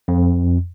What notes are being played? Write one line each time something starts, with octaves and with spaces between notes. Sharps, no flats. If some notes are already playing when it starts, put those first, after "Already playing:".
F2